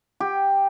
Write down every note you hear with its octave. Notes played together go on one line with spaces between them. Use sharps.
G4